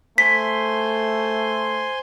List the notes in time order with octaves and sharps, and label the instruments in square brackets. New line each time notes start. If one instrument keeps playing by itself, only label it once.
[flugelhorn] A3 [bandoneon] C5 G#5 C6 [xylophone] B6